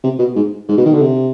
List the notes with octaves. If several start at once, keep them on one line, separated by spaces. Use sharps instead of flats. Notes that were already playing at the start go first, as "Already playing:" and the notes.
C3
B2
G#2
G#2
B2
D#3
D3
C3